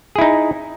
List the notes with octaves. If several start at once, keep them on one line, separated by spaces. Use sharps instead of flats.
D#4 E4 G#4